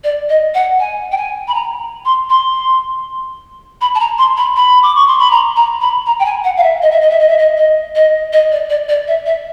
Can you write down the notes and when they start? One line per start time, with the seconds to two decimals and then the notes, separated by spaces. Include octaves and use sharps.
0.04 D5
0.29 D#5
0.54 F#5
0.79 G#5
1.11 G5
1.17 G#5
1.47 B5
1.54 A#5
2.05 C6
2.29 C6
3.81 B5
3.94 A5
3.99 A#5
4.18 C6
4.37 B5
4.56 B5
4.82 D6
4.95 C#6
5.07 C6
5.19 B5
5.31 A#5
5.56 A#5
5.81 B5
6.06 A#5
6.19 G5
6.25 G#5
6.44 F#5
6.57 F5
6.63 E5
6.82 D#5
6.91 E5
7.01 D#5
7.10 E5
7.19 D#5
7.28 E5
7.38 D#5
7.57 D#5
7.95 D#5
8.32 D#5
8.51 D5
8.70 D5
8.89 D5
9.07 E5
9.26 E5